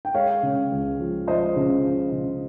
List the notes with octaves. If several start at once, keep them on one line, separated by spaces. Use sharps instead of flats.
G5
G#3 C#5 F5
C#3
C#2
F3
F3 C5 D#5
C#3
F3
C#3